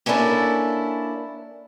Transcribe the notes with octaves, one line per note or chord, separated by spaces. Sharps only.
A#3 C#4 D4 E4 A4